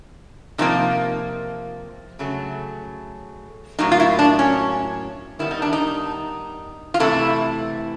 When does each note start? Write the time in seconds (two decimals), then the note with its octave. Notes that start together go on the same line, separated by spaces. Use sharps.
0.58 C3 F3 A#3 D#4
2.19 C#3 F#3 A3
3.79 A2 F#3 A#3 D#4
3.92 F4
4.00 E4
4.19 D4
4.39 C#4
5.39 D#3 G3 B3 E4
5.51 D#4
5.62 D4
5.73 D#4
6.94 F4
7.00 C3 E3 A3 E4